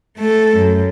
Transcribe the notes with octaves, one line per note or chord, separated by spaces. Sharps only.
A3 A4
F#2